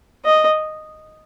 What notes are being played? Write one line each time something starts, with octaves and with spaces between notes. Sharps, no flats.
D#5